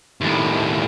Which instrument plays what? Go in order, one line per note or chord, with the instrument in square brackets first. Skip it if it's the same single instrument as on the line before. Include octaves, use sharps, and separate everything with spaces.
[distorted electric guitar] D#2 A2